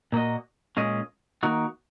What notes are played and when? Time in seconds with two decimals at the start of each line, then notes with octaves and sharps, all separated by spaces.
0.12 A#2 A#3 F#4 D#5
0.77 A#2 G#3 C#4 G#4 D#5
1.43 D#3 A#3 D#4 F#4